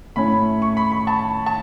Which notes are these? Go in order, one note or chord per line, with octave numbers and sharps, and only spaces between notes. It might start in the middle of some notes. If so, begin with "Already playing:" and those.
A2 A3 C#4 B5
C#6
B5
B5
A5
A5